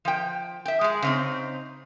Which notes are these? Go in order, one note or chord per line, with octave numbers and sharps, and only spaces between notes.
F3 G5
E5 G5
G#3 G#4
C#3 C4 D#4